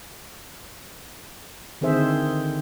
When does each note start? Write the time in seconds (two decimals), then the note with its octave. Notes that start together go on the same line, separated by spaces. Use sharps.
1.81 D3 D#3 C4 G#4 C5 E5